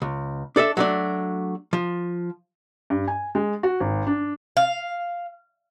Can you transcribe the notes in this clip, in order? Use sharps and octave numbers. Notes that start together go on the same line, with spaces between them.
C#2
D4 A4 D#5 E5
F#3 A3 D4
F3
G2
G#5
G#3
F#4
G#1
D4
F5